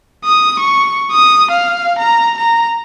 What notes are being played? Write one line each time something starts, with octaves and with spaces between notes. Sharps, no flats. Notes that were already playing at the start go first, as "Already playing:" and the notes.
D#6
C#6
D#6
F5
A#5
A#5